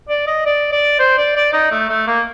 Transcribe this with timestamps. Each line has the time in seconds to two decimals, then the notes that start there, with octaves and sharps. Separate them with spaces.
0.09 D5
0.27 D#5
0.46 D5
0.72 D5
0.99 C5
1.18 D5
1.36 D5
1.53 D#4
1.71 A3
1.89 A3
2.07 A#3